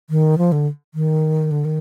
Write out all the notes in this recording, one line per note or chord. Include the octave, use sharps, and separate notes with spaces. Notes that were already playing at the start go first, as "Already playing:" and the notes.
D#3
F3
D3
D#3
D3
D#3